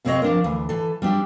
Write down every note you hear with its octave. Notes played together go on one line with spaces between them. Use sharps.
F2 C3 C4 D4 C#5 D#5
F3 D4 A#4
D2 E3
E3 A4
G3 C4 D4 G4